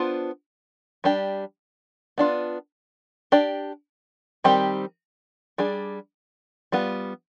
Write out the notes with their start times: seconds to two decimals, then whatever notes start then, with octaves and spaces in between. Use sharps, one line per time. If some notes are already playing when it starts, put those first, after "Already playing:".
Already playing: B3 D4 F4 C5
1.04 G3 D4 G4
2.18 B3 D4 F4
3.32 D4 G4 D5
4.44 D#3 G3 C4 G4
5.58 G3 D4 G#4
6.72 G3 B3 F4